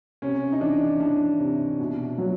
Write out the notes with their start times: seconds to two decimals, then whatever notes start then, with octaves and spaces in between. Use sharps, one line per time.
0.22 C3 C#4
0.52 D#4
0.61 E3 D4
1.00 E3 D4
1.40 C3
1.79 B2
2.18 F#3